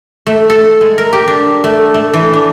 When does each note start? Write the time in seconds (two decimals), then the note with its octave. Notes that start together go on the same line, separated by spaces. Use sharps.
0.27 A3
0.50 A4
0.81 G#3
0.98 A#4
1.13 G4
1.28 D4
1.64 A3
1.94 A3
2.13 E3
2.33 D4